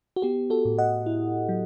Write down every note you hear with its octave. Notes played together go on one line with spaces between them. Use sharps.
F#4
B3 G4
F#4 A4
A2
D#5 F#5
E4
F#3